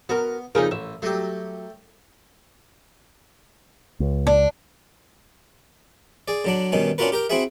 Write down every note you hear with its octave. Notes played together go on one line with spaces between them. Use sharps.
B3 F#4 A#4
F2 C#3 D#4 G#4 A#4
A1 E5
F#3 A3 G4
C#2
D4
G#4 D5
D3 F#3 D4
G2 B2 D#3 C#4
C#4 D4 F4 F#4 A#4 B4
G4 A#4 G5
C4 E4 F#4 G#4 E5